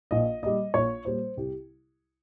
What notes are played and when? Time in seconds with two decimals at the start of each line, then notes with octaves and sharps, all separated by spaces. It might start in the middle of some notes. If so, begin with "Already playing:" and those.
0.11 A#1 D#5
0.42 A#2 G3 D#5
0.74 A#1 C#5
1.05 A#2 G3 C5
1.37 C2 G4